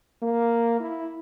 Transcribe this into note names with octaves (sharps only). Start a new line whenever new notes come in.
A#3
E4